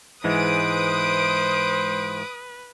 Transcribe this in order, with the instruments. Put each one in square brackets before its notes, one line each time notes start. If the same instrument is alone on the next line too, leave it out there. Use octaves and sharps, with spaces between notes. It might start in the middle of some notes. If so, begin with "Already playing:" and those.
[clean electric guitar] G#2 E3 G#3 [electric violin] B4 [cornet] C5 [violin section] D#6 D7